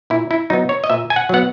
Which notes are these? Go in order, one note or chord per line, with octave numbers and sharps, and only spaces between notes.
A#2 E4
E4
F#3 B3 D#4
C#5
D#5
A#2 E5
G#5
F#5
F#3 B3 F#5